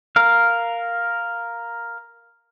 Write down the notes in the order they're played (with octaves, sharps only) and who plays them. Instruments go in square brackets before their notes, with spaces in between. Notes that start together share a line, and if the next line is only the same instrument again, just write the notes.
[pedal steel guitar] A#4 F5